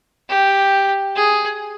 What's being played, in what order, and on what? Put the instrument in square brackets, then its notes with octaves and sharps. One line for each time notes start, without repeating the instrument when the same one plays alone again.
[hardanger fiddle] G4
G#4